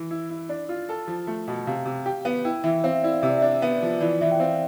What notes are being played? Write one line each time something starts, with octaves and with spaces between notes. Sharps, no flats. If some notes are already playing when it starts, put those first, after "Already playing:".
Already playing: E3
E4
E4
D4
F4
A4
F3
A3
B2
C3 F5
C3
G4
B3
E4 G5
E3 E5
C4 F5
E5
E4 D5
F5
C3 E5
D5
D4 E5
B3
F3
E3 D5
E3 E5
G5
C4 F5